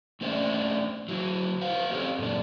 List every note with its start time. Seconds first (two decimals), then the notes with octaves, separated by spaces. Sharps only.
0.21 A3 C#4 D4 C5 E5 G5
1.09 F#3 E4
1.61 C5 F5 F#5
1.91 C4 G4 A4 C#5
2.18 F#2 A#2 D4